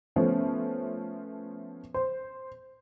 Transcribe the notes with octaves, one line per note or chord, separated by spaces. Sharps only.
F3 A3 B3 C#4
C5